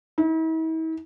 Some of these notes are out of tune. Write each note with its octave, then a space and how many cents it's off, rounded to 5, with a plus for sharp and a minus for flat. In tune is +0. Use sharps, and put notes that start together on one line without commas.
E4 -45